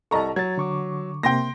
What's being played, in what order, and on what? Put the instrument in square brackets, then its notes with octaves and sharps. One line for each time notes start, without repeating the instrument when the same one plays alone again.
[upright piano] C2 A#5 C#6 [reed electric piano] A4 D#5 A5
[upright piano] F#3 [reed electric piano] G#6 A6
[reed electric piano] D3 C#6 D6
[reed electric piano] C3 A#3 [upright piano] G5 C6 A#6